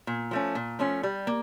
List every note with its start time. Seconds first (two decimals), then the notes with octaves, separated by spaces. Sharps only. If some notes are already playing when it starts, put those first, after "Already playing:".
0.07 A#2
0.31 F3 A3 C#4
0.55 A#2
0.79 F3 A3 C#4
1.03 G3
1.27 A#3